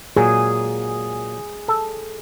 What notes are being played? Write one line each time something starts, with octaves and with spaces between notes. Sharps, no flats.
A#2 F#3 G#4
A4